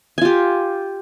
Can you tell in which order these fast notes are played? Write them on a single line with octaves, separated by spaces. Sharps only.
G#5 F4 G4